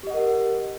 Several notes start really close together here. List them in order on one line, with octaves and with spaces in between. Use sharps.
G4 D#5 F#5 A#4